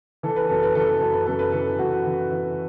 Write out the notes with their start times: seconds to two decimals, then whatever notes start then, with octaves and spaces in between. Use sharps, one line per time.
0.23 E3 A4
0.36 B4
0.49 F#2 A4
0.63 B4
0.75 E3 A4
0.88 B4
1.00 F#2 A4
1.13 B4
1.27 F#2 A4
1.39 B4
1.52 E3 A4
1.79 F#2 F#4
2.06 E3
2.32 E3